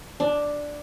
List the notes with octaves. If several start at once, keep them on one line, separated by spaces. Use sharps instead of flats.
D4